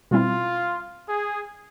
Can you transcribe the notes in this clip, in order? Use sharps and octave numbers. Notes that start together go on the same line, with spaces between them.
B2 G3 C4 E4 F4
G#4